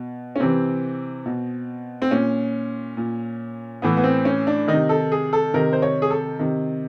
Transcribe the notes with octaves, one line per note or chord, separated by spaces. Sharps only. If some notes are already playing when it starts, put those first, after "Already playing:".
Already playing: B2
C#4
C3 E3 C4
B2
C4
A#2 C#4
A#2
A2 E3 B3
B3
C4
C#4
D4
C3 D#3 D#4
A4
G#4
A4
C3 D#3 A#4
C5
C#5
G#4
A4
C3 D#3